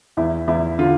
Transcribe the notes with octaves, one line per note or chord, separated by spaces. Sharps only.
E2 E4
E2 E4
D3 F4